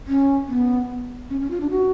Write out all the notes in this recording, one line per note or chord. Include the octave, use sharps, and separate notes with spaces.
C#4
B3
C#4
C#4
F4
D4
F#4